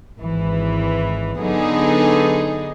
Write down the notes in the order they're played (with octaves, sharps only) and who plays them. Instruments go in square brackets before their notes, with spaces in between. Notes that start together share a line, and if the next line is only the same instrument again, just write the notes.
[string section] G#1 G#2 E3
D3 F#3 B3 D#4 G#4